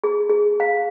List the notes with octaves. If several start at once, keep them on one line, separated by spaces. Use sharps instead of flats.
G#4
G#4
F5